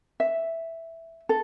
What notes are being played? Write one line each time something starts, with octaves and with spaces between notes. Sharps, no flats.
E5
A4